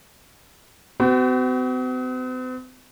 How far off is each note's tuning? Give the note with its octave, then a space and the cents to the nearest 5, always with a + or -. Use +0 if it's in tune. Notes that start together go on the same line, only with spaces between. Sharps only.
C4 -45 F#4 +35